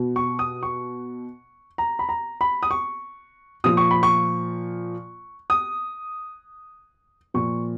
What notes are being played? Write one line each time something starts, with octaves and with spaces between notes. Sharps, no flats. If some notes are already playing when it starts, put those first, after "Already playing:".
Already playing: B2
C#6
D#6
C#6
A#5
B5
A#5
B5
D#6
C#6
A#2 F3 D#6
C#6
B5
C#6
D#6
A#2 F3 C#6